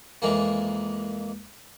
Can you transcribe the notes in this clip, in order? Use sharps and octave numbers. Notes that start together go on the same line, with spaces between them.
F2 E3 G#3 A#3